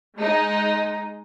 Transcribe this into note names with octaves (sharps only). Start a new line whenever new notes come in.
G#3 D#4